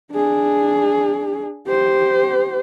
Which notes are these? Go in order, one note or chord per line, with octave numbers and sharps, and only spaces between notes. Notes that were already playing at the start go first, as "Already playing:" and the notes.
D4 G#4
G4 C5